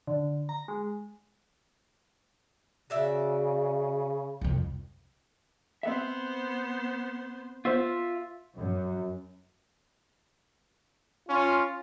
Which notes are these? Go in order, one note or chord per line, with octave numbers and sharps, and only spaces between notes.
D3
A#5
G#3
C#3 F#4 D5 E5
C2 F2
B3 C4 C5 E5
B3 F4 C5 E5
F#2
C#4 F4